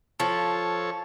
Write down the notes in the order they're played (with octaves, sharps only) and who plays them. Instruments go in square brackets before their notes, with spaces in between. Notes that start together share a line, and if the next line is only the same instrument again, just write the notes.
[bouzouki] F3 [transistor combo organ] A4 C#5